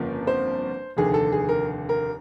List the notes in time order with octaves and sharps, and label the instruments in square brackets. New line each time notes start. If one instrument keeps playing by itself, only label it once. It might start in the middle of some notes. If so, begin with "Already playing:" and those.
Already playing: [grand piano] G1 F2 C#3 F3 A#3
C5
F1 D#2 D3 G#4
A4
G#4
A#4
A#4